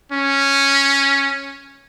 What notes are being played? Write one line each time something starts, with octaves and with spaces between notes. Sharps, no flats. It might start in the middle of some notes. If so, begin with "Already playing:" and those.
C#4